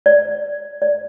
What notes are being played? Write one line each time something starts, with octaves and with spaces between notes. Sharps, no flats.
D5
D5